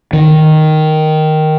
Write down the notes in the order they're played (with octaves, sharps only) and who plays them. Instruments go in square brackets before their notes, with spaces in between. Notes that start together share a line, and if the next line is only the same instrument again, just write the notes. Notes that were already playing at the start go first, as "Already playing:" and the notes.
[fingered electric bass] D#3